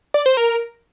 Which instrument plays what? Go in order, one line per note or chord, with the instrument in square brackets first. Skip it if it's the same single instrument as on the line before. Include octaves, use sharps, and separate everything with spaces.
[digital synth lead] D5
C5
A#4